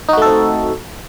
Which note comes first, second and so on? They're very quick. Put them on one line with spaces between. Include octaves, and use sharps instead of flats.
D#4 F#4 A3 A4 C4